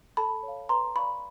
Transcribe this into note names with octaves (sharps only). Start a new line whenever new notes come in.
A4 A5 B5
C#5
F5
B4 A#5 C6
D5 F5 B5 C#6